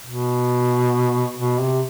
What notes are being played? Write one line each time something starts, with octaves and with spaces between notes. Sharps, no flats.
B2
B2
C3